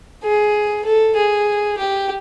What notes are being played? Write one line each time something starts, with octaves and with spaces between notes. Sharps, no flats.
G#4
A4
G#4
G4